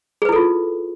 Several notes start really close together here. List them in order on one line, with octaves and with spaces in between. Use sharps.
G#4 B4 E4 A4 F4